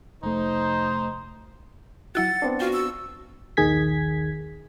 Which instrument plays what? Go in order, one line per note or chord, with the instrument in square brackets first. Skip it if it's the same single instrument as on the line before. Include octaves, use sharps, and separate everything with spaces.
[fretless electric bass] F1 A3 [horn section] D#4 C5
[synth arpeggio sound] F#3 E4 F#4 [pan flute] F#5 [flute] A6
[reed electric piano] B3 C4 D4
[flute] F4 [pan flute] F#4 [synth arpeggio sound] G5
[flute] E6
[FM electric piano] A#1 D#2 D#3 G#4 G#6 B6